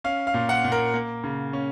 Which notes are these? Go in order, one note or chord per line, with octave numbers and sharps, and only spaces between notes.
C#4 F5
F5
A#2
F#5
A#2
A#4
A#3
C#3
C#4